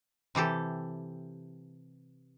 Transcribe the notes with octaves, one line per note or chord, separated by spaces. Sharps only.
C3 E3 G4 A4